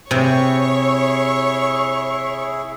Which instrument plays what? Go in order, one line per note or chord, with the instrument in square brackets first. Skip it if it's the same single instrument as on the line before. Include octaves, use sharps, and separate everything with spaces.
[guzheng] C3 [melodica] E4 G#4 [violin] C#5 C#6